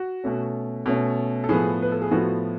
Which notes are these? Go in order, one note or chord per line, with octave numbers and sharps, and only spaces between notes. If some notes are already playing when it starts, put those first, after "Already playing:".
Already playing: F#4
B2 A3 C#4
B2 A3 C#4
A4
A2 F3 B3 G#4
B4
A4
G#4
A2 F3 B3 F#4